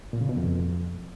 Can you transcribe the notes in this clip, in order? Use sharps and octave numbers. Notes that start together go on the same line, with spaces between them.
A#2
C#3
B2
F2